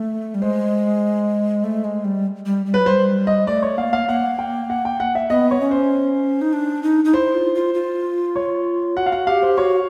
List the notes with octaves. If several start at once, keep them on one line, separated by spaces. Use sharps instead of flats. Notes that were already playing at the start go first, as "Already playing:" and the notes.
Already playing: A3
G3
G#3 C5
A3
G#3
G3
G3
G3
F#3 B4
G3 C5
D#5
A3 D5
C#5
A#3 F5
F5
A#3 F#5
G5
F#5
G5
F#5
E5
B3 D#5
C#5
C#4
C5
D#4
D4
D#4
D#4
E4 C5
F4
F4
F4
C#5
F#4 F#5
F5
F#5
G4 F5
C5
F#4 C#5